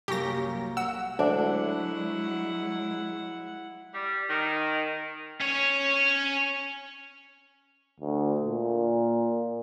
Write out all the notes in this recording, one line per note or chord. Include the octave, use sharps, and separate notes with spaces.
C2 F#2 A#3 G4 C#6 A#6
F#5 E6
D2 F#3 G#3 D4 E4 F#5
G3
D#3
C#4 C#5
D2
A#2